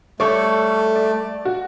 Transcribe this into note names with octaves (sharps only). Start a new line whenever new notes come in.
G3 A3 A4 C#5 C#6
D5
F#4